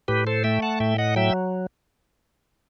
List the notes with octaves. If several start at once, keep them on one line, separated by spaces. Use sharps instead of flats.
A2 G4 B4
A4 C5
A3 E5 G5
F#5 A5
A2 E5 G5
D#5 F#5
F#3 E5 G5